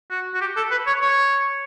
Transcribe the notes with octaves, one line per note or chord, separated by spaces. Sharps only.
F#4
F#4
G4
A4
B4
C#5
C#5